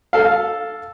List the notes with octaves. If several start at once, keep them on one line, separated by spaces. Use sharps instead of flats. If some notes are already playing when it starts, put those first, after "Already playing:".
A4 F5